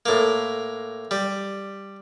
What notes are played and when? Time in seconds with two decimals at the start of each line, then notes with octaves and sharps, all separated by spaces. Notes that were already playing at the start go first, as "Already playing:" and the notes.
0.06 A2 A#3
1.11 G3